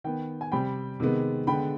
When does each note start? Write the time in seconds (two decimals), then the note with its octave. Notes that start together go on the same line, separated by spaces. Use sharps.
0.04 D#3 B3 G5
0.41 G#5
0.52 C3 G3 C4 G5 B5
1.00 C3 D#3 G#3 B3
1.47 D3 G#3 B3 G5 B5